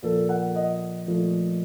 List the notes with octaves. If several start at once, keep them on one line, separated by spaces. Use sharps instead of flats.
A#2 F3 A#3 A4
F#5
D#5
A#2 F3 A3